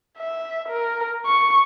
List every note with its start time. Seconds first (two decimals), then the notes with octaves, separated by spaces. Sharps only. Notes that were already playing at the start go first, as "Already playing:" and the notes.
0.18 E5
0.68 A#4
1.26 C#6